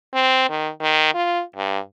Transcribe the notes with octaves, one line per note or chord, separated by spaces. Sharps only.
C4
D#3
D#3
F4
G2